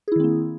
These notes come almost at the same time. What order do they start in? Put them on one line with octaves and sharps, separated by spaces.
G#4 E4 D#3 C4 A#3